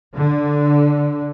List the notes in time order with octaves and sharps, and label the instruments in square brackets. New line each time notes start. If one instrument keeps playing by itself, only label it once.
[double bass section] D3